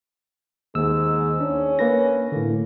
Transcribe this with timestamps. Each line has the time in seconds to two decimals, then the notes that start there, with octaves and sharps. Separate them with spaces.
0.75 D#2 G#2 E6
1.41 C#4 D4
1.79 A#3 B4 A#6
2.32 A2 D3